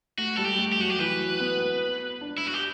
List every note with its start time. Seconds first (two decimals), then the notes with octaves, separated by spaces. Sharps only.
0.18 A3 F#4
0.36 G3 A4
0.45 G4
0.59 A3
0.73 G4
0.79 F#3 F#4
0.90 G4
0.99 E3 B4
1.19 F#3
1.40 B3
1.60 B3
2.21 D4
2.38 E4
2.47 F#4
2.54 G4